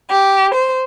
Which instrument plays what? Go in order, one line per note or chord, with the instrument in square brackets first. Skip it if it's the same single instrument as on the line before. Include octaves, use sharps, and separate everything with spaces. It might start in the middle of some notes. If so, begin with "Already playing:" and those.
[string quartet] G4
C5